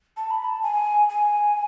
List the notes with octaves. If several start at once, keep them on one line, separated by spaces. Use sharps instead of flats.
A5
B5
A5
G#5
G#5